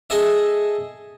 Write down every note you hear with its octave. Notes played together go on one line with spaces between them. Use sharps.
G#4 A4 D#5 E5